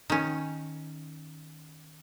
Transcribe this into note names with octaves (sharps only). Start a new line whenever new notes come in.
D#3 C#4